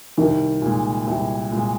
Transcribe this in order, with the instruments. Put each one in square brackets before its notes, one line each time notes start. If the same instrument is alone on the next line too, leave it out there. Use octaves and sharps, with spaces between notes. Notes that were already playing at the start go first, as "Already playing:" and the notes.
[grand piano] C2 [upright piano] D#3
[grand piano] A#2 G#3
C2
A#2 G#3